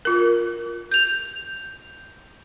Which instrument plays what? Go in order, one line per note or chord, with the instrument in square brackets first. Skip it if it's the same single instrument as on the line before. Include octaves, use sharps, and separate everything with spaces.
[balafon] F4 A#4
[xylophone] G6 F7